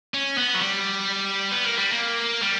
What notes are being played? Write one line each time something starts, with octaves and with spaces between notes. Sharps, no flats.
C#4
B3
F#3
G3
B3
A#3
G3
A#3
G3